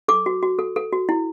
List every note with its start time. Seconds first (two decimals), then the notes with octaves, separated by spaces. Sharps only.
0.08 A4 D6
0.26 F#4
0.43 F#4
0.59 A4
0.76 A4
0.93 F#4
1.09 E4